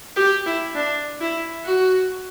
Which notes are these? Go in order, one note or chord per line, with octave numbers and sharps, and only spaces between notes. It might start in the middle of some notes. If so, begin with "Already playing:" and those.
G4
E4
D4
E4
F#4